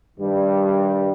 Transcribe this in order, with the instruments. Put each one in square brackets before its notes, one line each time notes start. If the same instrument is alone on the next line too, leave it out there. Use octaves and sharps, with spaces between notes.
[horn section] G2 D#3 G3